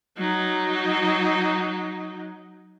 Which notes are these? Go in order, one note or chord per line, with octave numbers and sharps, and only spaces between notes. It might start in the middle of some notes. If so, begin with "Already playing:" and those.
F#3 D#4